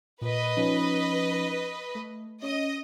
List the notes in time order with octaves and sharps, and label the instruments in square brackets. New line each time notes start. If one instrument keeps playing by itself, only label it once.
[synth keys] A#2 [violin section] B4 D#5
[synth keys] F3 C#4 D#4
A3
[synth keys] C#4 [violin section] D#5